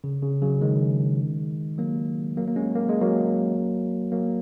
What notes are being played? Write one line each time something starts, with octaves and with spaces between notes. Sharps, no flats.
C#3
C#3
C#3 F#3
D#3 G#3
F#3 A#3
F#3 A#3
A#3
G#3 C#4
A#3
G#3
F#3 A#3
F#3 A#3